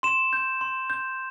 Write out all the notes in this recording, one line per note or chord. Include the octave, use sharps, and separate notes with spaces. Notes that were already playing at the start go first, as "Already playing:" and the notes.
C6 E7
G6
C6
G6